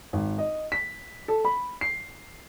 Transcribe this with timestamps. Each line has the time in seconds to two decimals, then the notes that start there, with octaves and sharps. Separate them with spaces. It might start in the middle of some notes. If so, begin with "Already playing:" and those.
0.13 G#1
0.38 D#5
0.72 B6
1.28 A4
1.45 B5
1.81 C7